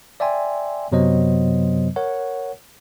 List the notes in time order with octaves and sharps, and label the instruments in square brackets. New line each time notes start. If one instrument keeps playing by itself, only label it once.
[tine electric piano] D5 E5 G5 G#5 C6
F#2 C3 F#3 B3 C5 D#5
A#4 C#5 F#5